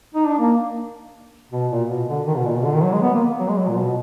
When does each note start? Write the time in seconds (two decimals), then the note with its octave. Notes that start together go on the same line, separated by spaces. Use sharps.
0.15 D#4
0.27 D4
0.40 A#3
1.52 B2
1.71 A#2
1.89 B2
2.08 D3
2.27 D#3
2.36 B2
2.45 A#2
2.55 B2
2.65 D3
2.74 D#3
2.83 F#3
2.93 G#3
3.02 B3
3.14 A#3
3.39 F#3
3.49 G#3
3.58 F#3
3.68 A#2
3.77 B2